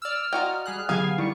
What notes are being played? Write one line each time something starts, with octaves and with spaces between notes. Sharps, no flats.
D5 E6 F6
F4 F#4 D5 D#5 G5 A#5
G3 G#4 F6 F#6
D3 F#3 B3 G4 G#4 F5 G#5
D#3 G3 E4 C#6